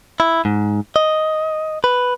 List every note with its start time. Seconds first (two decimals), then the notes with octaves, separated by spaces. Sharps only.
0.20 E4
0.45 G#2
0.96 D#5
1.84 B4